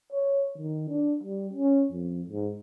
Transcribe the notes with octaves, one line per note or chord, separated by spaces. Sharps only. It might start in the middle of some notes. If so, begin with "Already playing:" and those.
C#5
D#3
D4
G3
C#4
F2
G#2